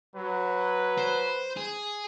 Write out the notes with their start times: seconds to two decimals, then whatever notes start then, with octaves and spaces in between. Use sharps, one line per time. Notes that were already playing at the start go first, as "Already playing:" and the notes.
0.16 F#3 B4
0.98 C5
1.57 G#4